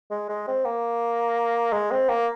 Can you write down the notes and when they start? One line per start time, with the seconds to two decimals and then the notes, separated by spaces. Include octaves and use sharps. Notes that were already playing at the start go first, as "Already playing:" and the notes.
0.10 G#3
0.29 G#3
0.47 C4
0.65 A#3
1.72 G#3
1.91 C4
2.09 A#3